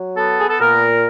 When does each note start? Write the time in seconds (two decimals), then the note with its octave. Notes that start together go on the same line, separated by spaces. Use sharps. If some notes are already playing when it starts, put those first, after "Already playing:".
Already playing: F#3
0.15 B3 A4
0.39 G#4
0.50 A4
0.60 A#2 A#4